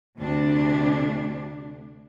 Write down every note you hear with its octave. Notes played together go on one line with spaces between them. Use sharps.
D2 C3 D4